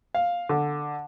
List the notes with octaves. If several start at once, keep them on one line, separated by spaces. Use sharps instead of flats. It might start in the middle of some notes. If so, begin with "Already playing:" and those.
F5
D3